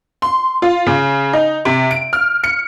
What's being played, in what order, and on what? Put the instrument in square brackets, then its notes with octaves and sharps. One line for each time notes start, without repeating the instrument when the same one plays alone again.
[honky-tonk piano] C6
F4
C#3
D#4
C3
D7
F6
C#7